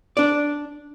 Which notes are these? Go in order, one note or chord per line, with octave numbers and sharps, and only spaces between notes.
D4 D5